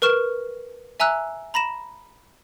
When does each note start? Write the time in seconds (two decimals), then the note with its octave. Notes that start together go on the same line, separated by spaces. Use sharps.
0.02 A#4 B4 C#6 F6 E7
1.00 E5 G#5 A#5 E6 F#6
1.54 A#5 B5 A#6 E7